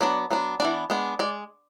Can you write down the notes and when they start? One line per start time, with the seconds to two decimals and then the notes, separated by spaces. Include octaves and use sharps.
0.01 F#3 B3 D4 D5
0.31 F#3 B3 D4
0.60 E3 B3 D4 D5
0.90 G#3 B3 D4
1.19 G#3 D5